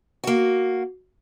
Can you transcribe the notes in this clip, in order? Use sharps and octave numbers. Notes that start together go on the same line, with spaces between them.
A#3 F#4